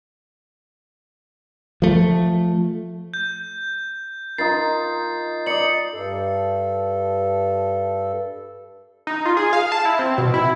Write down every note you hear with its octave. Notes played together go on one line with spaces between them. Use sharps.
F3 A3
G6
D#4 F4 A#4 A6 C7
D5 D#5 C#7 F#7
G2 A4
D#4
F4
G#4
F5
A5
E4
C4
B2
E4